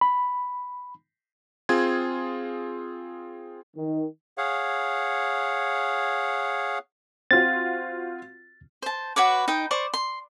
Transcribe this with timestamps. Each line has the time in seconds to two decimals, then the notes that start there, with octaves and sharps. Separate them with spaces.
0.01 B5
1.69 C4 F4 G#4 G#6
3.76 D#3
4.38 G#4 C#5 F5 F#5
7.31 C4 F4 F#4 A6
8.82 C5 A5
9.16 F#4 B4 C#5 D6
9.48 D#4 G5
9.71 C5 D5 C#6
9.94 C6